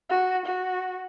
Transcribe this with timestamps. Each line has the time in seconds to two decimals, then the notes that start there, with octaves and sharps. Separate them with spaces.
0.10 F#4
0.46 F#4